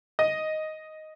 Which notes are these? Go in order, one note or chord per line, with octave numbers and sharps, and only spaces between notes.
D#5